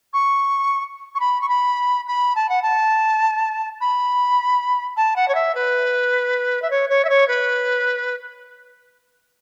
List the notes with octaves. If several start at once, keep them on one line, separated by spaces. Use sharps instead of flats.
C#6
C#6
B5
C#6
B5
B5
A5
F#5
A5
B5
A5
F#5
C#5
E5
B4
E5
C#5
C#5
E5
C#5
B4